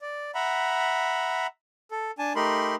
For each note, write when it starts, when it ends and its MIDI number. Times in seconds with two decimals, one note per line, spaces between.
0.01 0.31 74
0.35 1.47 76
0.35 1.47 78
0.35 1.47 82
0.35 1.47 83
1.91 2.11 69
2.19 2.33 62
2.19 2.33 80
2.19 2.33 81
2.36 2.76 57
2.36 2.76 63
2.36 2.76 67
2.36 2.76 70
2.36 2.76 83
2.36 2.76 84